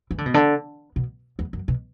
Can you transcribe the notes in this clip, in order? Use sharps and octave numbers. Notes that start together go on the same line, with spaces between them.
E3
D3
B2
D3
B2
E2
F#2
B2